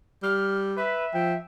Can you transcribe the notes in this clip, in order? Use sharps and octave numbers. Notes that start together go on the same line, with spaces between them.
G3 F6
B4 E5
F3 G5